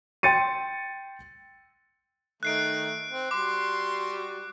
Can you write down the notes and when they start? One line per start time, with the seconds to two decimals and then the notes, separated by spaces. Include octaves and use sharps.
0.23 G5 C6 A6 C#7 D#7
2.43 D#3 A3 D#4 F#6 C7 D7
3.10 C4
3.31 G3 F#4 C6 D6